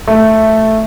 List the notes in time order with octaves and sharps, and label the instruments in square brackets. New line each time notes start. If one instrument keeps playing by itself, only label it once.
[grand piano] A3